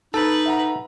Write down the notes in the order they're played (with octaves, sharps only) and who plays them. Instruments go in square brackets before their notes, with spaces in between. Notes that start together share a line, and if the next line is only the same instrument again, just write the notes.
[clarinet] D#4 [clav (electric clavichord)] A4 [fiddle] B4
[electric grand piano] E5 F#5 A#5